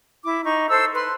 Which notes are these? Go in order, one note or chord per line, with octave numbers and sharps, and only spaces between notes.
E4 D6
D#4 C#6
A4 C5 E6
B4 C6